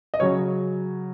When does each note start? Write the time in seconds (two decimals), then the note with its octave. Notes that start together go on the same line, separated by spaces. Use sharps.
0.14 D#5
0.20 C#3 F#3 C#5